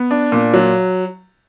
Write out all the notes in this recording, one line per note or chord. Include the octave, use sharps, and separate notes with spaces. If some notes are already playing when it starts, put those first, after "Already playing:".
Already playing: B3
D4
A#2
F#3